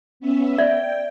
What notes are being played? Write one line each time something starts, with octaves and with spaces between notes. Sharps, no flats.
B3 C#4 E5
D5 E5 G5